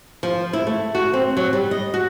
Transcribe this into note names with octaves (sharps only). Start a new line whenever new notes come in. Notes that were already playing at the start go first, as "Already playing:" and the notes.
F3
E4
A3
F#4
C4
F#3
G3
D#5
F#4